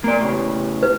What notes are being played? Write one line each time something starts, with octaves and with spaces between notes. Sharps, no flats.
A#3 D5
A2 C#3
B4